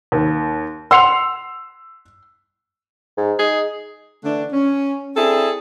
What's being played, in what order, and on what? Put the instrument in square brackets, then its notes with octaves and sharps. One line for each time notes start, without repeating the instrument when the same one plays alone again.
[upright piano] D#2
[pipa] F#5 C6 [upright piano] E6 C7 F7
[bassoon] G#2
[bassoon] D#4 [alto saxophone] G#4
[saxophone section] D3 E3 A3 D4
C#4
C4 D4 E4 G#4 A4